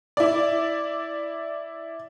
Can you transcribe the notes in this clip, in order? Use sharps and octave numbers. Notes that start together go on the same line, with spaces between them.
E4 D5